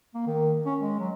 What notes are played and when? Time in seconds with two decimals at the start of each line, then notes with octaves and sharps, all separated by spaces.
0.15 A#3
0.27 D#3
0.66 C#4
0.80 G#3
1.00 F#3